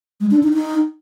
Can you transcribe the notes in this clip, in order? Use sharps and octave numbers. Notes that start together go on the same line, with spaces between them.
G#3
D4
D#4
D#4